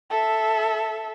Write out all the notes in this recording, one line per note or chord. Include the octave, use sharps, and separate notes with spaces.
A4 E5